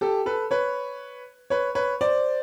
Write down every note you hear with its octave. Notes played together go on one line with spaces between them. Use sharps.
G4 A4
A4 B4
B4 C#5
B4 C#5
B4 C#5
C5 D5